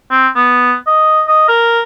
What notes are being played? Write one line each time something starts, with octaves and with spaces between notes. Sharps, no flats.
C4
B3
D#5
D#5
A#4